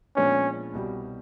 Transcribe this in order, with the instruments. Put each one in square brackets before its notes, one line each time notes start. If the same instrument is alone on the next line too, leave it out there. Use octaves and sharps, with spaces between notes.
[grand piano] A#2 F3 G#3 B3 D4 [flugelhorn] C#4
[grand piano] C2 B2 G3